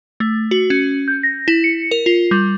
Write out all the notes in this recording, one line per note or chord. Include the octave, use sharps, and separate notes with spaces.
A3
F#4
C#4
G6
A#6
E4
C#7
A#4
F4
G3